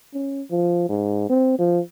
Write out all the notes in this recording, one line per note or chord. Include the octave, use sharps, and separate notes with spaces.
C#4
F3
G#2
C4
F3